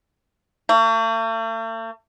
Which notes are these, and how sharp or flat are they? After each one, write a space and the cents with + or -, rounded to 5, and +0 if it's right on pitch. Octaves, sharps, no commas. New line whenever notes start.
A3 +45